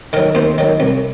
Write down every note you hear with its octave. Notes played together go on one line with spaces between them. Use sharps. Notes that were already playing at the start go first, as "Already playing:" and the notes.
D#3 F#3 A#4
D#2 C5
D#3 F#3
C2